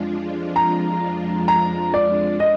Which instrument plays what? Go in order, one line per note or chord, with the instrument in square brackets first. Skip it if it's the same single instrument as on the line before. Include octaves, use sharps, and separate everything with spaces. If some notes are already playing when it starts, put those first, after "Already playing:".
Already playing: [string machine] F2 F3 G#3 D4 F4
[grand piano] A#5
A#5
D5
D#5